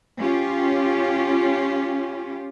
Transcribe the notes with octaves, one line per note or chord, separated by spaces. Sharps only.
C#4 F4 G4